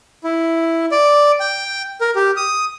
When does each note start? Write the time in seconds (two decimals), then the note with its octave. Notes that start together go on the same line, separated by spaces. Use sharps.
0.24 E4
0.92 D5
1.40 G5
2.01 A#4
2.16 G4
2.37 D#6